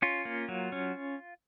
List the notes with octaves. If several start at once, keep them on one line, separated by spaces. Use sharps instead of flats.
C#4 F4
A#3
F#3
C#4